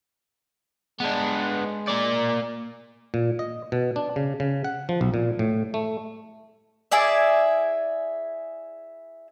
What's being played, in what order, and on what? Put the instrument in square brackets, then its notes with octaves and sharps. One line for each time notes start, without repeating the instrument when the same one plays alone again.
[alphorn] G#3 [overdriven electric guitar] B3 D4
[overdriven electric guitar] A#3 D5
[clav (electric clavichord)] A#2
D#5
B2
D4
C#3
C#3
F#5
F3
B1
A#2
A2
A3
[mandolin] E4 G#4 D5 E5